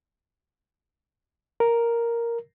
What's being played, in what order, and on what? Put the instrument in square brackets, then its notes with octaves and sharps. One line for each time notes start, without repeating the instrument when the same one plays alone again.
[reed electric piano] A#4